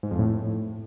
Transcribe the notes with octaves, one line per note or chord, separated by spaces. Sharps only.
G#2
F2
A2